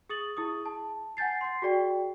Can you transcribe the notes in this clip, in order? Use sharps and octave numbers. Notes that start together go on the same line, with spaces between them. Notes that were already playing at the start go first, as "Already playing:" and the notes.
G#4 D#6 A6 F#7
E4 G#4 D#6
A5
F#5 G#5 G6 A6 C7
C6 C7
F#4 G#4 D5 G5